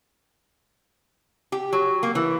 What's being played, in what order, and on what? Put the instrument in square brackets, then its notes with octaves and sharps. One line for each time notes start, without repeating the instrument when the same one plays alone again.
[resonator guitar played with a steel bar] G4
F#3
A#3
E3